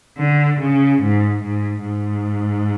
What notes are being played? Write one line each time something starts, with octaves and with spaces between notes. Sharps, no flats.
D3
C#3
G#2
G#2
G#2